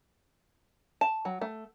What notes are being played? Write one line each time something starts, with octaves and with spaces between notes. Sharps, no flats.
A5
F#3
A3